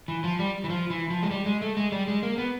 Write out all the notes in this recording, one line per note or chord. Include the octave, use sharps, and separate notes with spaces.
E3
F3
G3
E3
F3
E3
F3
G#3
G3
G#3
A3
G#3
G3
G#3
A#3
B3